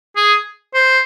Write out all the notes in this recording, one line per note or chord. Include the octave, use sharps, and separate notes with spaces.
G#4
C5